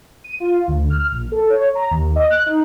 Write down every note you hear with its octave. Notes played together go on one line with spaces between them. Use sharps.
D#7
F4
D2
F6
A#1
A4
C#5
A#5
D#2
D#5
F#6
D#4